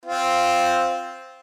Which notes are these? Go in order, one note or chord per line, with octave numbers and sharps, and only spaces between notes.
C4 F4